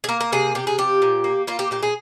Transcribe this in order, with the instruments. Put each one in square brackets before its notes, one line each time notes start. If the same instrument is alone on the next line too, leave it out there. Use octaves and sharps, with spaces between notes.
[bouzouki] G#4
A#3 A#4
A#4
C3 G#4
C3 G4
G#4
F3 G4
A#2
A#3
A#3 F4
G4
A#2 G4
G#4